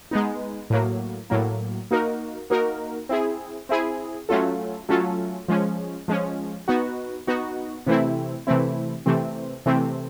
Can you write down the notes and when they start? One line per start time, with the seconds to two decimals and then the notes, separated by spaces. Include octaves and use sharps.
0.11 G#3 B3 D#4
0.70 A2 F#3 A#3
1.30 A2 F#3 A#3
1.91 A#3 D#4 F#4 A#4
2.50 A#3 D#4 F#4 A#4
3.09 C4 E4 G#4
3.69 C4 E4 G#4
4.29 F#3 A3 C#4 F4 A4
4.89 F#3 A3 C#4 F4 A4
5.48 F3 G#3 C#4
6.08 F3 G#3 C#4
6.68 B3 D#4 F#4
7.27 B3 D#4 F#4
7.86 C3 E3 A3 C4 E4
8.47 C3 E3 A3 C4 E4
9.06 C3 E3 A3 C4
9.66 C3 E3 A3 C4